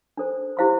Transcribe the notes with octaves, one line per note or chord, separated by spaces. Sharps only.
D4 A4 C5
E4 G4 C5 F5 C6